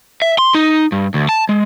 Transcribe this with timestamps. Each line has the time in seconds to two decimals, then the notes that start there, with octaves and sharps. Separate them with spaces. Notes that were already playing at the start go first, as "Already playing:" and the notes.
0.22 E5
0.38 C6
0.54 D#4
0.92 G2
1.14 D2
1.29 A5
1.49 G#3